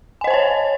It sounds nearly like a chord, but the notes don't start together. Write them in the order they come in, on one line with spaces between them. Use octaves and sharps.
G#5 D#5 C5 A5 C#5